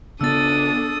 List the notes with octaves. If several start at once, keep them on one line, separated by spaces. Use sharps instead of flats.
C#3 B3 D4 A4 D#6 E6 A6